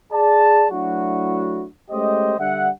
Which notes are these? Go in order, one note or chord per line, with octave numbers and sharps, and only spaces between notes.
G#4 D5 A5
F#3 A3 D4 E4 F#4
G#3 A3 C#4 G4 C5 D#5
D3 G3 D4 E5 F#5